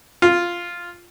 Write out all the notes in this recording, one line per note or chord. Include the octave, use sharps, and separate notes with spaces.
F4